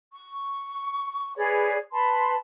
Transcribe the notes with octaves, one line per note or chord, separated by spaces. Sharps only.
C#6
G#4 B4 C#5 D5
B4 A5 B5 C6